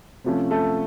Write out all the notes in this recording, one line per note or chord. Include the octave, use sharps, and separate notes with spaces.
C3 F3 A3 C#4
A3 A4